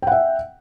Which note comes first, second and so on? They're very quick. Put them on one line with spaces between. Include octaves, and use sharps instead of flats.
G5 F#5 E5